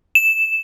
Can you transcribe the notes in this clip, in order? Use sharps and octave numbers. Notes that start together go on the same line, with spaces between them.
E7